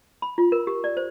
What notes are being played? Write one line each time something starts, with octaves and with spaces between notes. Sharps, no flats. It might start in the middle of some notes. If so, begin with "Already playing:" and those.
B5
F4
A#4
G4
D5
C5